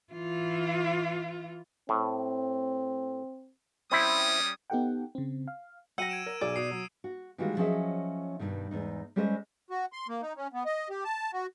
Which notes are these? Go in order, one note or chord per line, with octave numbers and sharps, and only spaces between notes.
E3 F4
A2 C4
G3 C4 C#4 E4 E5 D#6
B3 D#4 G4 A4 F#5 G5
C#3 C4
F5
F#3 F#5 G5 E6 A#6 D#7
G#6 D7 E7
A#4
B1 G#4 D5 E6
B2 D#6 C7
F#3
F#4
D#3 E3 G3 G#3 F4 F#4
F3 F#3 C#4 G#4 D#5 E5
G2 B2 D#3
E2 G#2 D#4
G3 G#3 C#4 A4 C5 D#5
F#4
C6
A#3
D#4
C#4
B3
D#5
G4
A5
F#4